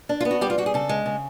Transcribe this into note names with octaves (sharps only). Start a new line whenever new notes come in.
D4
F4
B3
F#4
G3 G4
F4
G3 F#4
G#4
C#3 A4
G#3
C#3